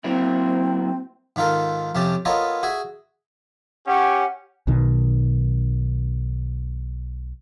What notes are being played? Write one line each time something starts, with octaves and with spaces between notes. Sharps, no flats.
F#3 A#3 C4 E4
G#2 D#3 F4 A4 A#4
F2 C3 C#4 G4 A5
B3 F4 A4 A#4 C#5 D#5
F#4 G#4 E5 G#5
C#4 G4 F#5
B1 B2 D#3